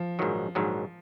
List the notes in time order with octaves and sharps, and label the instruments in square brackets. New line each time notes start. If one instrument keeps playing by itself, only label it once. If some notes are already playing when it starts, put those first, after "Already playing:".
Already playing: [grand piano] F3
[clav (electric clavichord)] A#1 G#2 D#3 F#3
A#1 G#2 D#3 F#3